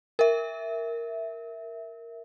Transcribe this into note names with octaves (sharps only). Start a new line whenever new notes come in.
A#4 E5